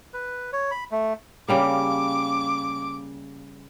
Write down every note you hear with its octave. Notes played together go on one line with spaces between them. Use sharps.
B4
C#5
B5
A3
C#3 G3 A#3 D6